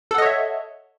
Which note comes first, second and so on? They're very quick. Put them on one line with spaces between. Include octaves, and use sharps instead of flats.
A4 F#5 D#5 C#5 E5